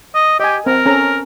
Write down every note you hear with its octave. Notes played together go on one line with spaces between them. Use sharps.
D#5
G4 D#5 G#5
C4 A#4
C#4 A4 A#5